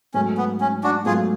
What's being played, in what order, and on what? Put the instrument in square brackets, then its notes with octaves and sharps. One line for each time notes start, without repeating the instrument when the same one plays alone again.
[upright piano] G#2 F#3 A3 [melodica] C#4
[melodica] B3
C#4
D4 F#4
[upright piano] G#2 F#3 A3 [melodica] F4 G#4